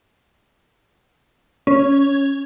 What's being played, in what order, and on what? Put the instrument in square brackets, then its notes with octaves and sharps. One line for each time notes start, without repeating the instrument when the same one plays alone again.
[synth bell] C#4